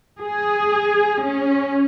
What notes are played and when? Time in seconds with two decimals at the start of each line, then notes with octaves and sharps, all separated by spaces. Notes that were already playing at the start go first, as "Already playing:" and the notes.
0.20 G#4
1.24 C#4